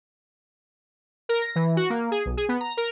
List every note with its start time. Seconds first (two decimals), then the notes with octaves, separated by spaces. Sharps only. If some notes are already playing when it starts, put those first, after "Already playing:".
1.29 A#4
1.42 A#6
1.55 E3
1.77 F#4
1.90 A#3
2.11 G#4
2.26 B1
2.37 G#4
2.49 B3
2.61 A#5
2.77 A#4